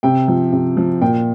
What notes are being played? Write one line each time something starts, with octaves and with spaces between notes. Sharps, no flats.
C3 G5
F3
C3
F3
A#2 G5